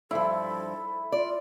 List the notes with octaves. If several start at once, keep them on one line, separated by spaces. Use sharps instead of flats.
G2 F3 E4 A4
F4 D5